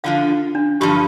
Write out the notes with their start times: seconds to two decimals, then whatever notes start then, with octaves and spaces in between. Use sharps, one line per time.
0.04 D3 F3 D4 F4 F5
0.55 D4
0.81 G2 D3 F3 G4